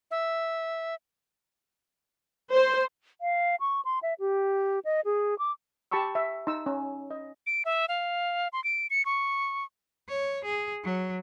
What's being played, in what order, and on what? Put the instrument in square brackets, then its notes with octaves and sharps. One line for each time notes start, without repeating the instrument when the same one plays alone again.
[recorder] E5
[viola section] C5
[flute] F5
C#6
C6
E5
G4
D#5
G#4
D6
[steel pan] G4 A5 B5 C#6 E6
E5
D#4 E6
C#4
D#5
[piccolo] D7
E5
F5
C6
D7
C#7
C#6
[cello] C#5
G#4
F#3